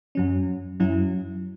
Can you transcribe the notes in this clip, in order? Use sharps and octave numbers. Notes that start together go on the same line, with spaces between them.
F#2 F#3 C#4
F#2 F#3 C#4 E4